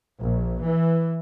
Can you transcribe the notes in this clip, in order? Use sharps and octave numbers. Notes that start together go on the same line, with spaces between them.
A#1
E3